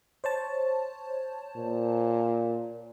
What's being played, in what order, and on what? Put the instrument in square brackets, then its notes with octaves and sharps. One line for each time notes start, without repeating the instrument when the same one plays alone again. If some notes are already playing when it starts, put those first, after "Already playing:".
[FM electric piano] C5 C#5 A5
[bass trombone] A#2